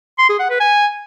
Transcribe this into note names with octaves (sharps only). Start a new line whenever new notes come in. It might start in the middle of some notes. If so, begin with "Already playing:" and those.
C6
G#4
F#5
B4
G#5